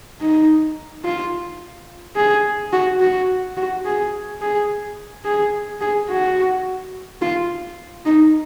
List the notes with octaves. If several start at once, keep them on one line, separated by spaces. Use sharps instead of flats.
D#4
F4
G#4
F#4
F#4
F#4
G#4
G#4
G#4
G#4
F#4
F4
D#4